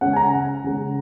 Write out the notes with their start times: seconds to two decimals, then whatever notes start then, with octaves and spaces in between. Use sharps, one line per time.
0.01 C#3 G#3 C#4 F#5
0.13 G#5
0.16 A#5
0.33 F#5
0.64 C#3 G#3 C#4